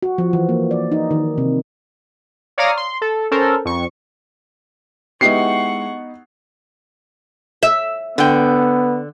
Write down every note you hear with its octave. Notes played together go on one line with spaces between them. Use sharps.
F#4
F3
E3
A#3
D5
D#4
D#3
C3
C#5 D5 F5 A#5 D#6 F6
C6
A4
C#4 A4 A#4 C5
F2 C#6
G#3 B3 D#4 E4 G4 F#5 C#6 C7
E5
D3 B3 G5